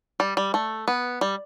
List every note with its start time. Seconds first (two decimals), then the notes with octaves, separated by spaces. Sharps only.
0.20 G3
0.37 G3
0.54 A3
0.88 B3
1.21 G3